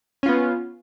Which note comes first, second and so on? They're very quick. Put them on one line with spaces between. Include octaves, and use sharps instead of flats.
C#4 F4 B3